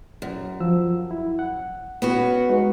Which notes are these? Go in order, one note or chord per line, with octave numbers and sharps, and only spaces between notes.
F#2
F3 E6
E4
F#5
B3 C#4 F#4
G#3 D#4 F#4